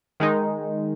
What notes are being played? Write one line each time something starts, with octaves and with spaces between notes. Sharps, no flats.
D#3 G#3 D#4